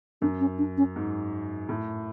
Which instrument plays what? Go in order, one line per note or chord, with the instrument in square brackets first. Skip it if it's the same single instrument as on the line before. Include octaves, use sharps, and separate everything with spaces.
[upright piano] F#2 [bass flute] D4
[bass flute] C#4
D4
C#4
[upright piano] G#2
A2